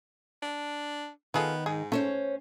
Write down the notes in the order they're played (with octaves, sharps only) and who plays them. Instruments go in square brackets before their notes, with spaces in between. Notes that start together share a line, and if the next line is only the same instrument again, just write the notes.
[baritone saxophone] D4
[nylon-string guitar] D#3 [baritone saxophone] B3 [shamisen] F4 G#4 A4
[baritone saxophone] G#2 [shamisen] G#4
[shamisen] A3 [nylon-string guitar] C#4 C5 C#5